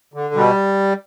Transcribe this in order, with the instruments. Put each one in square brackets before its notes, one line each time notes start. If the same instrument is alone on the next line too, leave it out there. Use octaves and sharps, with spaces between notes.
[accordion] D3
B2 G3